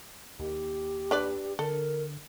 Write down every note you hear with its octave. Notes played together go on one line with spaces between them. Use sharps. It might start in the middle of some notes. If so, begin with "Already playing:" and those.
D#2 G4
D4 B4 D5
D3 A4 A#4